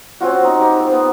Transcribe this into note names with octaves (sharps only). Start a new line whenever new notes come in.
C4 C#4 F4 F#4
C4 D#4
C4 D#4 G4
C4
B3